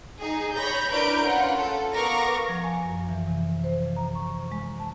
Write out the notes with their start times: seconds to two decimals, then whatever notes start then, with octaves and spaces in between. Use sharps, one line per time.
0.19 D#4 G#4
0.56 C#5 B5 G6 A#6
0.91 D4 E4 A#4 B4 G6 D7
1.23 C#4 F4 F#5
1.56 A4
1.94 B3 A#4 F5 C#6 D6 A#6
2.49 F3
2.64 G#5
2.84 F#2
3.09 E3
3.27 C3
3.64 C5
3.78 F3
3.96 A#5
4.15 C#6
4.52 G#3
4.80 A5